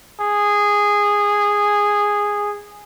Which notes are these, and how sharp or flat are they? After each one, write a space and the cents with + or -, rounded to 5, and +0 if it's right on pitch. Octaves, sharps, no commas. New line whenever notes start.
G#4 -10